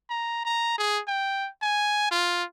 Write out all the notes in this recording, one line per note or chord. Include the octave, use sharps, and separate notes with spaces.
A#5
A#5
G#4
G5
G#5
F4